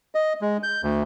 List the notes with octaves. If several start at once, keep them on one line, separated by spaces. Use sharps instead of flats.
D#5
G#3
G6
D2